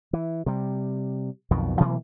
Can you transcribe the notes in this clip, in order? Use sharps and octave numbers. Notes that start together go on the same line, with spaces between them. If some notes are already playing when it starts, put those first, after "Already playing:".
E3
C3 G3
B1 F2 B2 D#3
B2 E3 F#3 A#3